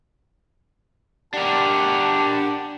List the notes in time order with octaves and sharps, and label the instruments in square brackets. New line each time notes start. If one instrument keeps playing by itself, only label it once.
[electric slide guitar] D4 A#4 [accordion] G4 D5 F#5 [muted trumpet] A5